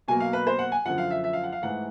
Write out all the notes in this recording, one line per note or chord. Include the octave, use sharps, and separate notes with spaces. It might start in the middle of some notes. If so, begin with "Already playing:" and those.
B2 F#3 A#3 G#5
F5
B4
C5
F#5
G#5
F#2 D3 F3 F#5
F5
E5
E5
F5
F#5
F5
G#2 E3 A3 F#5